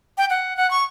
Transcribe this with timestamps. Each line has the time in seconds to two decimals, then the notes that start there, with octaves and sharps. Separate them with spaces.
0.18 G5
0.30 F#5
0.57 F#5
0.71 C#6